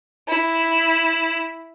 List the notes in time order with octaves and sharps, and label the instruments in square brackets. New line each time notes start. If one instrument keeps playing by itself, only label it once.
[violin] E4